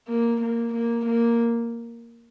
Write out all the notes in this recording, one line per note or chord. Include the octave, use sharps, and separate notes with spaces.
A#3
A#3
A#3
A#3